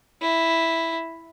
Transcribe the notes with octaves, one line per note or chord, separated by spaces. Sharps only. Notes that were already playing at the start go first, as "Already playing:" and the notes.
E4